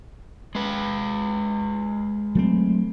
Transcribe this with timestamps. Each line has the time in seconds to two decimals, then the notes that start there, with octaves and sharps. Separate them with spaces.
0.55 G#3 B4
2.35 F#3 A3 C4